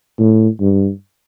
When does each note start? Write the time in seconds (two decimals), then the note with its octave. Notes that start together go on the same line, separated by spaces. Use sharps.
0.19 A2
0.61 G2